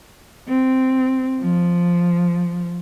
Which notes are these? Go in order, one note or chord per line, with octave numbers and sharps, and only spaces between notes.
C4
F3